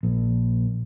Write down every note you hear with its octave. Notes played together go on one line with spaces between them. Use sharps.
A#1